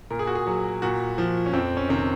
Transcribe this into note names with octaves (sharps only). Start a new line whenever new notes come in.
A#2 A#4
G#4
F#4
G#4
F#3
A#2 F#4
F3
C#4
F2 C4
C#4
C3 D#3 C4